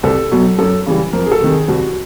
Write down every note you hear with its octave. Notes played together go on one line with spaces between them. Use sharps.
C2 A4
B2 F#3
F#2 A4
C#3 E3 G3
F2 A#4
G#4
A4
C3 D#3
G#4
C2 F#4